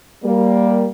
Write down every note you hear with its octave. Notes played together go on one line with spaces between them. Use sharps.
G3 A#3